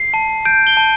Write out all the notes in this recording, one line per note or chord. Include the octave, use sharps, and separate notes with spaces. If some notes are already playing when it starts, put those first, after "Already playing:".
Already playing: C7
A5
G6 D7
G7
A5